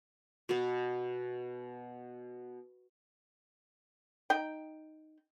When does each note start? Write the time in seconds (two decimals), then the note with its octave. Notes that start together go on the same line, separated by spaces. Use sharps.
0.49 B2 B3
4.30 D#4 G5